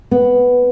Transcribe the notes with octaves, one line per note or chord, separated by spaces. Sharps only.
B3